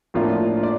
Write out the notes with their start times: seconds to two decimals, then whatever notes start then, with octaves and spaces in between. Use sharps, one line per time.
0.14 A2 F3 A#3 D4 F4
0.63 D5